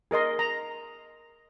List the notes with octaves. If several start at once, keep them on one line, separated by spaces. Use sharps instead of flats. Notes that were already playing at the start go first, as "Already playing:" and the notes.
G#4 A#4 D#5 C6
A#5